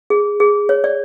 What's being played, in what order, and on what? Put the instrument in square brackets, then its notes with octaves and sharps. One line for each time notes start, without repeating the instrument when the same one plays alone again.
[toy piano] G#4
G#4
C#5
D5